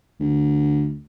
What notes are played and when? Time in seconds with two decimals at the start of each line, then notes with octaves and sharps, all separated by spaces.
0.20 D2